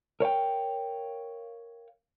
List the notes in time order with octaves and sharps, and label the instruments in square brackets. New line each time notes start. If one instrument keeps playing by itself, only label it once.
[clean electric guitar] A#4 C#5 F5 G5